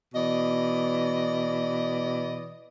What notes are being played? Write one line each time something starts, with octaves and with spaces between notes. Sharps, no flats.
B2 E3 D5 D#5